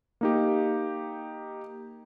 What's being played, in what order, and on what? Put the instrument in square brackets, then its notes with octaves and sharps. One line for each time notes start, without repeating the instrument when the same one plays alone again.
[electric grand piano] A#3 D#4 G4